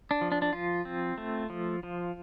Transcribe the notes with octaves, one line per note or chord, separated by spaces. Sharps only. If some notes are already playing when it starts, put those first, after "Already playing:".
D4
F3
D4
D4
F3 F4
C4
A3
F3
F3